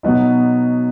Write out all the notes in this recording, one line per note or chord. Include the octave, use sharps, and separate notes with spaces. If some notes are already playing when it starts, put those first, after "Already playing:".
B2 F#3 B3 D#4